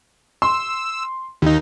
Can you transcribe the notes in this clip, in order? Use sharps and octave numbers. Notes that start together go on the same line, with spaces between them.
C6 E6
D#2 D#3 D#4